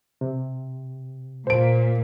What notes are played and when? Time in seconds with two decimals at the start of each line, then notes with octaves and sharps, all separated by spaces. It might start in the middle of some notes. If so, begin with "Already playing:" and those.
0.21 C3
1.47 A#2 C5 D7